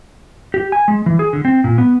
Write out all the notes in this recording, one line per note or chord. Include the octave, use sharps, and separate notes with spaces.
G4
G#5
G#3
E3
G#4
D3
C4
A#2
B3